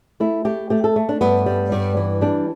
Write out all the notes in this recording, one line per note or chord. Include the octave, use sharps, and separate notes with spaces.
A3 E4
A3 G4
A3 G4
A4
A3
D4
G2 B3
G3
G2
E3
G3 D4